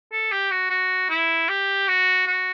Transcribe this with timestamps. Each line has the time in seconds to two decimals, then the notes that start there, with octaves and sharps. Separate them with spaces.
0.12 A4
0.32 G4
0.51 F#4
0.70 F#4
1.10 E4
1.49 G4
1.88 F#4
2.27 F#4